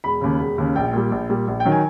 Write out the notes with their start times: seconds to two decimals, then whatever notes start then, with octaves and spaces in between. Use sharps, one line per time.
0.04 E1 B5
0.21 D#2 C#3
0.39 E1
0.58 D#2 C#3
0.76 A#1 G5
0.93 A#2 G3
1.11 A#1
1.29 A#2 G3
1.47 A#1
1.60 G5
1.65 D#3 F#3
1.72 G#5